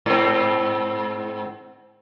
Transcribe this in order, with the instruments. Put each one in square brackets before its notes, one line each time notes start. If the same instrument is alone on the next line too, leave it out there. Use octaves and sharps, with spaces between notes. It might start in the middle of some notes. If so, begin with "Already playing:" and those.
[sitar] G#2 C4